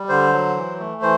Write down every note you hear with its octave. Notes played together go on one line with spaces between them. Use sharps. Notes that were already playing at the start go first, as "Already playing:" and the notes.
Already playing: G3
D3 C5
F#3
E3
A3
E3 C5